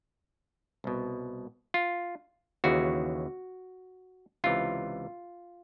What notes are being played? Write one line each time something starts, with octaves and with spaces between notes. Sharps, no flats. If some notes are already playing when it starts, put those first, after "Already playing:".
C2 B2
F4
D#2 C#3 E3 F#4
C#2 C3 E3 F4